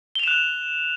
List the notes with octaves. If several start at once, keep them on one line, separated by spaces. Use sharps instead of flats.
F#6 E7 F7 G7